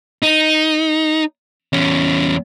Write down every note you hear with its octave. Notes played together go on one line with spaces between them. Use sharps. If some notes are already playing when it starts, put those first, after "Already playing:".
D#4
E2 C#4